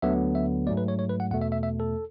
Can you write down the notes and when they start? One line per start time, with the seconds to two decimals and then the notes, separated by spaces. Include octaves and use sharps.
0.02 D2 D3 F#3 B3 E5
0.35 E5
0.67 G#2 F#3 A3 D5
0.77 B4
0.88 C#5
0.99 C#5
1.09 B4
1.20 F#5
1.31 E2 B2 A3 F#5
1.41 E5
1.52 E5
1.63 E5
1.80 A4